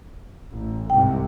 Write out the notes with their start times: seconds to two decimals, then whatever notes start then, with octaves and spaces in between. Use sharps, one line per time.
0.53 A1
0.90 C2 G#2 C3 G5